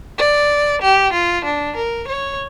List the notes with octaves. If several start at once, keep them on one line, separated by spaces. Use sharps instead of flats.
D5
G4
F4
D4
A#4
C#5